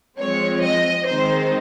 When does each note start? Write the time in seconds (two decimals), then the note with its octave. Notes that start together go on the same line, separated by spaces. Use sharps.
0.18 F3 G#3 C4 C#5
0.63 D#5
1.07 D#3 G#3 C4 D#4 C5